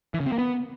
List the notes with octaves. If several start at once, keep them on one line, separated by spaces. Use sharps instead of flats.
E3
C#3
C4
A#3
B3